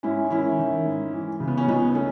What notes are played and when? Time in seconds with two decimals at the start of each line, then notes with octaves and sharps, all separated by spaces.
0.03 G#2 C#4 E4
0.30 D#3 C#4 E4
0.59 D#3
0.86 G#2
1.13 E3
1.40 C#3
1.48 B3
1.57 C#4
1.68 C#2 B3 D#4
1.95 A3 C#4